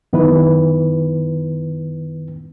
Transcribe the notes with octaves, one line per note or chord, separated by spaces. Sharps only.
F#2 D#3 B3 E4 B4